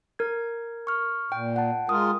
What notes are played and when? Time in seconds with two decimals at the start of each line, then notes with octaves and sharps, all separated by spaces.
0.19 A#4 G#6
0.87 C#6 F6
1.32 A#2 G5
1.56 F#5 A5
1.89 G#3 F4 A#4 D#6